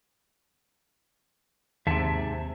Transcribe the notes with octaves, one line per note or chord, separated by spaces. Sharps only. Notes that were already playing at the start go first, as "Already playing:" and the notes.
D#2 G#2 C3 E5 A5